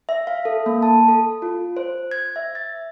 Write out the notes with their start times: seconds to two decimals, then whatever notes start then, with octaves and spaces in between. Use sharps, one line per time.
0.09 E5
0.27 F5
0.45 A4
0.66 A#3
0.83 A5
1.08 A4
1.42 F4
1.77 C5
2.11 G#6
2.36 E5
2.55 A6